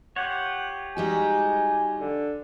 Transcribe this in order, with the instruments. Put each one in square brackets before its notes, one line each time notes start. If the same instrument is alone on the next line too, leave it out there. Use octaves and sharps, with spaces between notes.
[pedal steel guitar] F4 G4 C#5 [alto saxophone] F#5
[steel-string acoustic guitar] G3 D#4 F#4 [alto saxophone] G#3 [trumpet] G#5
[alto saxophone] D3